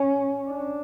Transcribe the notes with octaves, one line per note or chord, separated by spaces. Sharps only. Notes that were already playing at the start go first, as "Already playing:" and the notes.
Already playing: C#4
D4